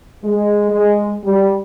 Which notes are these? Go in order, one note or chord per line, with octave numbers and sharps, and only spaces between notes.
G#3
G#3
G3